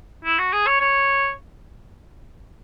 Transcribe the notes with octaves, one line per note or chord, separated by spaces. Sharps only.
E4
F#4
G#4
C#5
C#5